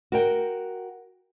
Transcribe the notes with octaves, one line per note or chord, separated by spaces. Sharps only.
F#4 A#4 G5